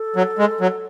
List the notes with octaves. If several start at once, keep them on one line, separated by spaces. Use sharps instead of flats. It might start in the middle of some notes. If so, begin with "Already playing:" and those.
Already playing: A4
F#3
G#3
F#3